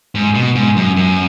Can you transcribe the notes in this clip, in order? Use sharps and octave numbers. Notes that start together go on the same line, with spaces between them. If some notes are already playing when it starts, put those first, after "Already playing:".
G#2
B2
G#2
F#2
F#2